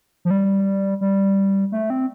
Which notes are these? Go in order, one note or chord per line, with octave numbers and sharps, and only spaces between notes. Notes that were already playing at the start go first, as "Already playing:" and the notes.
F3
G3
G3
A3
C4